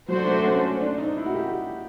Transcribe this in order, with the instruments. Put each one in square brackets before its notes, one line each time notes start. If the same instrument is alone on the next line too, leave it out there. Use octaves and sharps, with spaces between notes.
[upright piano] F#3 [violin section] D4 F#4 A4 C5
[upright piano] A3
C#4
D4
D#4
E4
F#4
G4